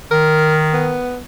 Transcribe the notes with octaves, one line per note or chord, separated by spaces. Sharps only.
D#3 A#4
B3